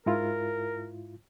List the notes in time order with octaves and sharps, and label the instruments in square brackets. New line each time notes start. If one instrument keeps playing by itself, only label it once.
[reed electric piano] G#2 E4 F4 [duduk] A#4